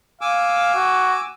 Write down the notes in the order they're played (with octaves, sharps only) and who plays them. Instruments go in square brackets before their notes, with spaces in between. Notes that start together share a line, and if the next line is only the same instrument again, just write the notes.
[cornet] F5 [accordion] G#5 D6 E6
[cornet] F#4